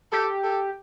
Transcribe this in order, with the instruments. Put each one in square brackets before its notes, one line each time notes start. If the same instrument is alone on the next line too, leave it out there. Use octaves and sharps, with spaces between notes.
[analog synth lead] G4 [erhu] A4
[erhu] A4